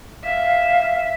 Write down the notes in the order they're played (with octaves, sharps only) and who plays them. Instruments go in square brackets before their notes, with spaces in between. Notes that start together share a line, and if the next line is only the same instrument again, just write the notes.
[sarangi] E5 [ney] F5